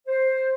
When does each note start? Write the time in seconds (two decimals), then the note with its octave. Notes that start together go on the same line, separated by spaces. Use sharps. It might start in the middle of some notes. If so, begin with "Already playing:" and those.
0.07 C5